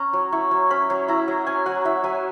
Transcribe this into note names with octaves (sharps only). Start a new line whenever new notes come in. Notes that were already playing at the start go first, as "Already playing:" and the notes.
Already playing: C#4 A#5
F#3
E4 C#6
F#3
C#4 B5
F#3
E4 A#5
F#3
C#4 G#5
F#3 F#5
E4 E5
F#3 G#5